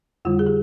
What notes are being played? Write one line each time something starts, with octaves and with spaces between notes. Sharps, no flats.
F2 D3 G3 F4
G#4
G4